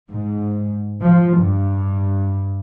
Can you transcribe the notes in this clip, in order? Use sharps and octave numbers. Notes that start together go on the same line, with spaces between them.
G#2
F3
G2